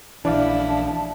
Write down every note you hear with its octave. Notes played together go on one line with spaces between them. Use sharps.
A#1 E3 D4 E4 D5 F5 A5